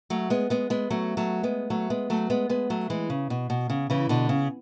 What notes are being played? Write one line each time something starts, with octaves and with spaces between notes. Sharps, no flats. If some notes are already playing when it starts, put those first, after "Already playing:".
F#3 A3
G#3 B3
G#3 B3
G#3 B3
F#3 A3
F#3 A3
G#3 B3
F#3 A3
G#3 B3
F#3 A3
G#3 B3
G#3 B3
F#3 A3
E3 G#3
C#3
B2
B2
C#3
C#3 E3
B2 D3
C#3